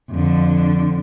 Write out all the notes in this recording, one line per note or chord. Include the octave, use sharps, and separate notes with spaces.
F2 D3